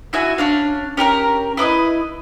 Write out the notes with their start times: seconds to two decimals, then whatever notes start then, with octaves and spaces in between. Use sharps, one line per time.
0.13 E4 F#4 E5 G#5
0.38 C#4 D4 F5
0.97 C#4 G4 A#4 A#5
1.57 E4 B4 D5 D#5